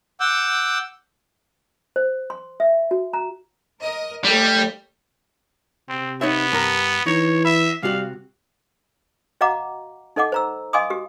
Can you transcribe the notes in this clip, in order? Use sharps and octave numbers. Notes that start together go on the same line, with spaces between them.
F#5 D6 E6 G6
C5
C6
E5
F#4
A#5
A#4 D#5
D#2 G3 A3
C3 C4
B3 D#4 C#5 E5
G2 A#4
E3 D#4 C#5
E5 B5
C3 G3 F#4 F5
F#4 D#5 F5 F#5 A#5 D6
D#4 A4 D#5 F#5 D6
C5 A#5 E6
D#5 F5 G#5 C6 D6 D#6
F#4 G4